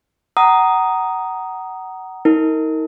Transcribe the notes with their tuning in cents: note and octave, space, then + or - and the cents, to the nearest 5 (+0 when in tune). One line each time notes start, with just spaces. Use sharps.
F#5 +25 A#5 +0 D#6 +0
D#4 +35 A#4 -20